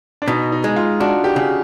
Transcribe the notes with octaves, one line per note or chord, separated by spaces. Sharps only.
D4
B2 D#4
D#4
G#3
F4
D4 F#4
G4
C#3